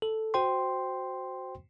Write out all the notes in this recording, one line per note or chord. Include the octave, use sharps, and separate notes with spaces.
A4
F#4 C5 G5 C6